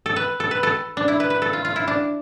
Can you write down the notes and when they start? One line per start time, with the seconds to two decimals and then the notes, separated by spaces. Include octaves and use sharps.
0.06 A4
0.16 B4
0.40 A4
0.51 B4
0.63 A4
0.97 D4
1.08 E4
1.20 B4
1.30 B4
1.42 A4
1.53 F4
1.65 F4
1.76 E4
1.88 D4